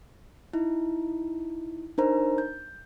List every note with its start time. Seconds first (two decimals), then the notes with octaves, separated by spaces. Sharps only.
0.53 D#4 E4
1.98 D4 D#4 A#4 C5 A#5
2.38 G6